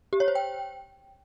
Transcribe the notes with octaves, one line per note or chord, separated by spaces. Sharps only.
G4
C#5
C5
G5